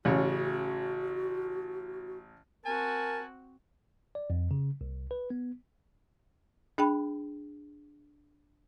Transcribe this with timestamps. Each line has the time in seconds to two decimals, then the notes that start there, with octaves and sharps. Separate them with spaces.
0.05 A1 C#3 F#4 C#5
2.65 C4 F#4 A#4 G#5 A5
4.15 D5
4.30 F2
4.51 C#3
4.81 C2
5.11 B4
5.30 B3
6.78 D4 G#4 G5 B5